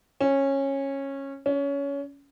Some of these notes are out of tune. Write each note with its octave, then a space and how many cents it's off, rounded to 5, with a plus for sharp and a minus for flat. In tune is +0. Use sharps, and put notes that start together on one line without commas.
C#4 -15
C#4 +20